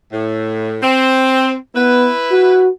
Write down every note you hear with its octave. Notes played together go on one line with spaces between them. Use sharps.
A2
C4
B3 E4 B4
F#4